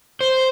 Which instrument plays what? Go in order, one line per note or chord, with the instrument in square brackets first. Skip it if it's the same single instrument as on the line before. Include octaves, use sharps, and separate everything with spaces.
[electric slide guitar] C5